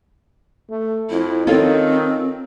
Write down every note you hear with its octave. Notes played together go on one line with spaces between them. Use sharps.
A3
F2 E4
D#3 C4 C#4 F4 A4